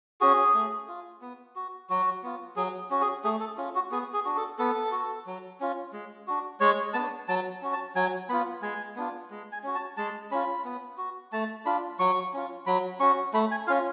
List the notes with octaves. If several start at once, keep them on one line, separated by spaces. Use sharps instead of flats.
C#4 F#4 G#4
A3
F4
B3
F#4
F#3 F#4
B3 F4
F#3 G#4
C#4 F#4
G#4
A3 G#4
A4
C#4 F4
F#4
B3 G#4
G#4
D4 F#4
A4
B3 A4
F#4
F#3
C#4 F4
G#3
D4 F#4
G#3 C#5
B3 D4 A5
F#3 A5
C#4 F#4
A5
F#3 G#5
B3 F4 B5
G#3 G#5
B3 D4 F4
G#3
G#5
C#4 F#4
A5
G#3 A5
C#4 F4 B5
B3
F#4
A3 A5
D4 F4 B5
F#3 C#6
C#4 F4
F#3 B5
C#4 F#4 C#6
A3 B5
G#5
C#4 F4 F5